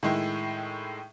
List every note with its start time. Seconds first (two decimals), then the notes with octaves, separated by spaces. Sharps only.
0.03 A2 D#3 G#3 E4